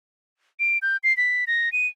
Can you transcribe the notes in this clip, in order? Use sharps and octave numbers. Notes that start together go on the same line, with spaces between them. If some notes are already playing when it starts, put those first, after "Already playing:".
D7
G6
C7
B6
A#6
D#7